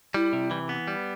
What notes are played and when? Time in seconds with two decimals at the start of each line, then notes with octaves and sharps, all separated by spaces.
0.14 G3 E4
0.33 C3
0.51 E3
0.69 B3
0.88 G3